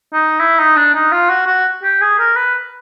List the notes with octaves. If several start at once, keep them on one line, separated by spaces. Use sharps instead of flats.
D#4
E4
D#4
D4
D#4
F4
F#4
F#4
G4
G#4
A#4
B4